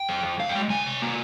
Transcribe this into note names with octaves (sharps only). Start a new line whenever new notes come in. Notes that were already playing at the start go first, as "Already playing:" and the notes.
Already playing: G5
F2
F2
G2 F5
G5
G#3
C3 G#5
C3
A#3